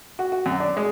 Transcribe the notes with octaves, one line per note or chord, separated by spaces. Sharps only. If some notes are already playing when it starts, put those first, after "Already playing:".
F#4
F#4
F#2
D4
G#3